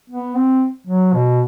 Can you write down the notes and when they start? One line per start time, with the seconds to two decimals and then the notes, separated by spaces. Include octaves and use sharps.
0.10 B3
0.36 C4
0.87 F#3
1.13 B2